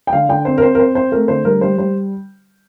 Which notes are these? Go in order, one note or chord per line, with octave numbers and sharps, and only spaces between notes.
G5
D3 F5
D3 G5
C4 C5
A#4
C4 C5
A#4
C4 C5
C4 C5
A3 A#4
D3 C5
G3 A#4
G3 C5
G3 C5